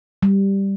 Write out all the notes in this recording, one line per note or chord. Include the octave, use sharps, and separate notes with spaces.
G3